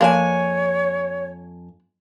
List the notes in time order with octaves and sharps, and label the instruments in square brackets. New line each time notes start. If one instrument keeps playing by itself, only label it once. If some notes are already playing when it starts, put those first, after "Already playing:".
[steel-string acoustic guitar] F2 G#5 [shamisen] A#3 D4 [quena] C#5